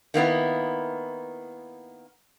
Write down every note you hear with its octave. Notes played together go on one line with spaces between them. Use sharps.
D#3 A#3 B3 E4